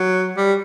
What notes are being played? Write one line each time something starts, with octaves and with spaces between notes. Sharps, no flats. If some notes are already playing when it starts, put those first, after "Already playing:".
Already playing: F#3
G3